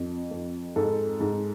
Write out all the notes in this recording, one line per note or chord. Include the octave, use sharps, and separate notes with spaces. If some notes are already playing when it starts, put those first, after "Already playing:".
Already playing: F2
F2
G#2 A4
G#2